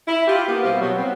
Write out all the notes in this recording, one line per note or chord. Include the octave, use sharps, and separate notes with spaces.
E4
F4 G4
A#3 B3
B2 G3 E4 G4 C5 F5
B2 F#3
B3 C4